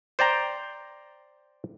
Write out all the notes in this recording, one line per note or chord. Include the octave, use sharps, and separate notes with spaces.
C5 D5 G5 A#5